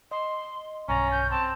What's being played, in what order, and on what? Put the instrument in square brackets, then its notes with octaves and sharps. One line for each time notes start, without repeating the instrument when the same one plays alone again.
[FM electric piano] D#5 [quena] C6
[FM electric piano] B1 G2 A6 [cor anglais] C#4 [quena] A#5
[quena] G6
[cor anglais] C4 [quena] A5